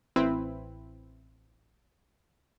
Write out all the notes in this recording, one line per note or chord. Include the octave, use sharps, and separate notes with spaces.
A1 C4 E4 B4